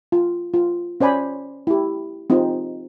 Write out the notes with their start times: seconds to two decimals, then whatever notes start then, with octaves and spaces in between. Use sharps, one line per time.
0.12 F4
0.54 F4
1.01 C#4 C5 D5 G#5 B5
1.67 E4 G4
2.30 C4 D#4 F4 G#4